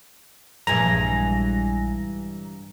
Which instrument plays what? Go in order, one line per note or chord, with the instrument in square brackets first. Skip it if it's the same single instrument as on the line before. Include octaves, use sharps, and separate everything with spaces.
[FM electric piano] A#1 G#5 A#6 [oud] G2 E3 G#3 [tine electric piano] A#5